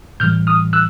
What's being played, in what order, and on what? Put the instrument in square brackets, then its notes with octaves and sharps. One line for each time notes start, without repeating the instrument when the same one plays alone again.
[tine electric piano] A2 E3 G3 F6 G6
D#6 F6
E6 F#6